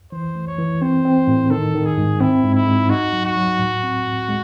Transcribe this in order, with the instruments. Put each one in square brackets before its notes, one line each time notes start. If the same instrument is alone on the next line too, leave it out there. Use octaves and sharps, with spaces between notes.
[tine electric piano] E3 [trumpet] C5
[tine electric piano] A3
[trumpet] C#5
[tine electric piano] E3
[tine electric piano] C4 [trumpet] C5
[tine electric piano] C4
A2
[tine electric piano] D#3 [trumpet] A4
[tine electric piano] D#3
[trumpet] G#4
[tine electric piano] G#2
[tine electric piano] C4 [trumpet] E4
[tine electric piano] G#2
[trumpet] E4
[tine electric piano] G#2
[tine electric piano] D#4 [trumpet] F#4
[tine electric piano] F#3
[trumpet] F#4
[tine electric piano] F#3
A2
C4
A2
G#3